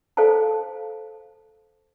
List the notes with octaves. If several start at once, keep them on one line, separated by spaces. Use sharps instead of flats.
A4 C5 F5 G5 A5